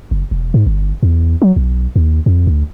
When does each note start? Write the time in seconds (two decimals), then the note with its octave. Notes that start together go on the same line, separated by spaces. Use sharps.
0.11 F#1
0.31 E1
0.54 G#2
0.66 G1
1.03 E2
1.42 F#3
1.56 B1
1.96 D#2
2.26 F2
2.47 D2